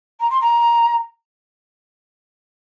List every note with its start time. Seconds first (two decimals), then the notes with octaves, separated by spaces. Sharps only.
0.20 A#5
0.30 C6
0.41 A#5